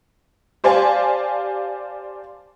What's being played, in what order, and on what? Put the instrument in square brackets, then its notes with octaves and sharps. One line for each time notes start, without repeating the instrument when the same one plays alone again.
[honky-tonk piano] G4 C5 D5 F5 G#5 A5